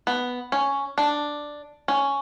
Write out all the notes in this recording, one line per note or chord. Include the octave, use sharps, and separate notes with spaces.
B3
C#4
D4
C#4